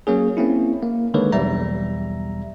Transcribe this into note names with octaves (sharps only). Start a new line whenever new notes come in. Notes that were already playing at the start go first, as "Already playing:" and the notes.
F#3 A#3 C#4 G#4
A#3 C4 C#4 E4
A#3
D3 D#3 G#3 A#3 B4 C#5
B1 E2 G3 E5 A#5